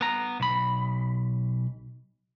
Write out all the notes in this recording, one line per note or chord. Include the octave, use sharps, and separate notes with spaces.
B3 A#5
B1 B5